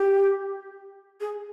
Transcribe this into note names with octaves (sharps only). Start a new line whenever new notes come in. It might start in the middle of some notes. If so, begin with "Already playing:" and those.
Already playing: G4
G#4